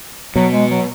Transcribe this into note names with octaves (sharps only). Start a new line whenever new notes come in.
B2 F#3
G#3
F#3